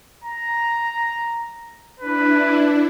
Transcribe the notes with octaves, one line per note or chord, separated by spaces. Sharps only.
A#5
D4 E4 B4